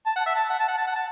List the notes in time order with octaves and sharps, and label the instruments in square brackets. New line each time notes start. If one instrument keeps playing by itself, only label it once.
[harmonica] A5
F#5
E5
A5
F#5
A5
F#5
A5
F#5
A5